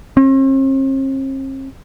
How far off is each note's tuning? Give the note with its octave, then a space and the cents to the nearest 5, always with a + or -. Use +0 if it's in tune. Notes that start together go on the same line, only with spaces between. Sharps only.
C4 +45